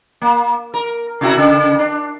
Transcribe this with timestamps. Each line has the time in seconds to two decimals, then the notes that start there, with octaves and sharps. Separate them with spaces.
0.21 A#3
0.74 A#4
1.21 C3 E4 F#4
1.37 C#3
1.79 D4